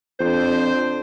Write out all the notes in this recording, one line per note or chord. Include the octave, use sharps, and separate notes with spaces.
F2 D4 C5